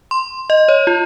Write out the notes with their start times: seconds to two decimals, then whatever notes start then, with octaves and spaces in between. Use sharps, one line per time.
0.11 C6
0.50 D#5
0.68 C#5
0.87 F4